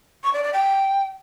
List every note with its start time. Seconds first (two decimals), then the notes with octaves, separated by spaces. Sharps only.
0.23 C#6
0.34 D5
0.44 D5
0.54 G5